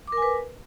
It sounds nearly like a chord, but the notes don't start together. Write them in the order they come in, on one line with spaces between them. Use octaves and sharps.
D6 A#4 G#5 B4